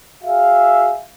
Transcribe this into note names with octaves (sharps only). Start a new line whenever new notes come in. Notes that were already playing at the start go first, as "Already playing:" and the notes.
F#4 G#4 E5 F5